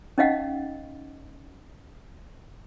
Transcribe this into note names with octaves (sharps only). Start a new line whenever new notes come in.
C#4 D#4 D#5 F5 F#5